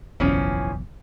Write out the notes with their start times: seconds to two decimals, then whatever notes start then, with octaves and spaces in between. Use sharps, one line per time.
0.20 F#1 B1 E2 E3 F3 C#4